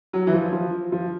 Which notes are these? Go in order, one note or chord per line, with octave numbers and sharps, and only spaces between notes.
F#3
E3
F3
F3
F3